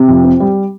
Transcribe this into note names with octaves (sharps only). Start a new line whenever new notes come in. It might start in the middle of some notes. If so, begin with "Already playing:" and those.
Already playing: C3
F2
C4
G3